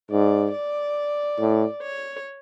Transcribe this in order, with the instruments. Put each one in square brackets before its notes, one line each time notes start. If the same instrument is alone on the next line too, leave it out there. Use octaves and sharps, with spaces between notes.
[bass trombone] G#2 [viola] D5
[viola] D5
[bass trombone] A2
[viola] C#5